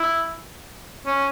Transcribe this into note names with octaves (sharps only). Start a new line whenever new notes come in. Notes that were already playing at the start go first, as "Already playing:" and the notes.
Already playing: E4
C#4